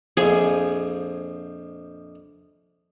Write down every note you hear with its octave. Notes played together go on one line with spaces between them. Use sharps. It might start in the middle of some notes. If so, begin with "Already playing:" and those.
A#1 F2 F3 G#4